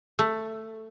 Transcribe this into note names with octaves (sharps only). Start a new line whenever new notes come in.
A3